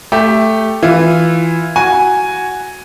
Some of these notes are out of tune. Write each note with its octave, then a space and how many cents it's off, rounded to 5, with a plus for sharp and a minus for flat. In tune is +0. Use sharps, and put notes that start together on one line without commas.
A3 +0 G4 +0
E3 +0 F4 +0
F#4 +0 G#5 +0